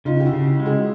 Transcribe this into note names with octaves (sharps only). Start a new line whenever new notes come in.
C#3 D#4 F4
G4
E4 F#4
C#3
G#3
F#4 G#4